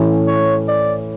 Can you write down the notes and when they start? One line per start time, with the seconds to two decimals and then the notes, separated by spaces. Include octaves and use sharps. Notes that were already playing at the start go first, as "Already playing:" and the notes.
Already playing: A2 E3 A3 C#4
0.28 C#5
0.68 D5